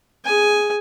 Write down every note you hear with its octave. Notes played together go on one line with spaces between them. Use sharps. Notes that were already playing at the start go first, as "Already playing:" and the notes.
G#4 G#5